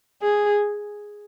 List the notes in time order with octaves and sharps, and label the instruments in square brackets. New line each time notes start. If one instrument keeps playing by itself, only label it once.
[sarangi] G#4